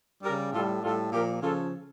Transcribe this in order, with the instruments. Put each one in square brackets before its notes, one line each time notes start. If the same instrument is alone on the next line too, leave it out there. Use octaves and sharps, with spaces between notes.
[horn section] C#3 G3 G4 A#4
A2 G3 F4 A4
A2 G3 F4 A4
A#2 F3 G4 A#4
C#3 F3 F4 A4